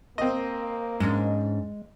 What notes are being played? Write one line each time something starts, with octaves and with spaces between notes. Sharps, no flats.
A#3 C4 D#5
G#2 G#3 C#4 D4